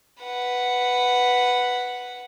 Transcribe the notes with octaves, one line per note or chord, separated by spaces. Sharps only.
B4 F#5